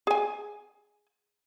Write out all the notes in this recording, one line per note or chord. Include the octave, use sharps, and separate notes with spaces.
G#4 G#5